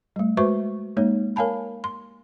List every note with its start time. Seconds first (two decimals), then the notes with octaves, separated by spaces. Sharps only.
0.16 G3 A3
0.37 G#3 F#4 B4 C5 E5 C#6
0.97 G#3 A#3 D#4 C#5
1.36 A#4 C#5 F5 G#5 A5 B5
1.84 C6